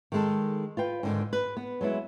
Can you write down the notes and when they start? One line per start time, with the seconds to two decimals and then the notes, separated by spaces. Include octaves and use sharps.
0.12 D#3 G#3 A4
0.77 F4 B4 G5
1.03 G#2 D3 D#3
1.33 B4
1.57 B3
1.81 F#3 G#3 B3 E4